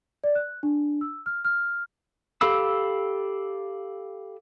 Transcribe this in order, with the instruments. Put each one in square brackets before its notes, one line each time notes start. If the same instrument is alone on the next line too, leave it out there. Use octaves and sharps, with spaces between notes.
[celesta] D5
F#6
D4
E6
F6
F6
[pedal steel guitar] G4 A4 F5 B5 E6